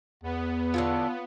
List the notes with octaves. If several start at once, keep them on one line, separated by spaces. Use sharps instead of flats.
E2 B3
D3 E3 F4 A4 C#5